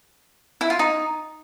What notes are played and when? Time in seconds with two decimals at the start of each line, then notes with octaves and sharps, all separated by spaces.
0.61 E4
0.70 F4
0.79 D#4